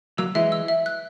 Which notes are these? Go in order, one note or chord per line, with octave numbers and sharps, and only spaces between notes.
F#3 A#3 E6
E3 G#3 E5
E6
E5
F#6